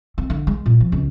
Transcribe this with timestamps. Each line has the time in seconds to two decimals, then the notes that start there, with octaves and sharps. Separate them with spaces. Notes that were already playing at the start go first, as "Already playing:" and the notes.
0.18 C4
0.30 D3
0.47 G#3
0.66 A#2
0.80 F3
0.92 C#2